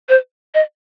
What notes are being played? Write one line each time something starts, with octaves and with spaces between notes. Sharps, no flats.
C5
D#5